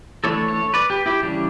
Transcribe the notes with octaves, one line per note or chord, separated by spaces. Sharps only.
E3 A3 D4 A4 C#5
A4 C#5
B4 D5
G4 B4
E4 G4
C#3 E3 G3 D4